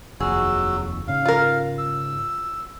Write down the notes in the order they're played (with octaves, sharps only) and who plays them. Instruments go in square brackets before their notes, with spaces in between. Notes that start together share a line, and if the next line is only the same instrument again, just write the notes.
[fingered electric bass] F1 D#2 [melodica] F#3 F#4 E6 [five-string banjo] G#4
[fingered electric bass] G#2 C#3 C#4 [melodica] F5
[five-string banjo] F4 A#4
[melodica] E6